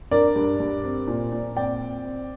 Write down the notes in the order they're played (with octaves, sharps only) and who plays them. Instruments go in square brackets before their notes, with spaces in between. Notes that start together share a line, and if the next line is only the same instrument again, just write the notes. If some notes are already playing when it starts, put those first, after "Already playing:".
[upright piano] D4 A#4 D5
G2
G2
C4
A#2
A#2
C4 D5 G5
C4
C4